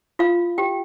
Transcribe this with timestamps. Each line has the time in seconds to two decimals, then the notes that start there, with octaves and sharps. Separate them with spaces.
0.19 F4 F5
0.58 G4 G5